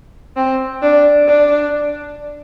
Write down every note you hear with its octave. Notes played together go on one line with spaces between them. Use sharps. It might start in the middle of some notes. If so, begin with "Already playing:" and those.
C4
D4
D4